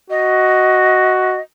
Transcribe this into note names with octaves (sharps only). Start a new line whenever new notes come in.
F#4 D#5